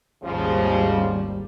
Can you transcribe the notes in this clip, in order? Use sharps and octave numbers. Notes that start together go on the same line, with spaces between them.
G#1 D#2 G#2 C#3 F3 G3